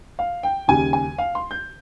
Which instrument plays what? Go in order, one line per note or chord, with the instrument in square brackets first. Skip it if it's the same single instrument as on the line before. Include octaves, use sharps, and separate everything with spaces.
[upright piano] F5
G5
D#2 C#3 G3 G#5
G#5
F5
C6
G6